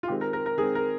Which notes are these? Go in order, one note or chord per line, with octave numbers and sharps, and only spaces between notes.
F4
D#3 G#3 C4 G4
A#4
A#4
A#4
D#3 G#3 C4 G#4
A#4